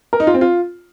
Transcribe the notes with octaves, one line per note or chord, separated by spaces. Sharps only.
A#4
D#4
F4
C4
F4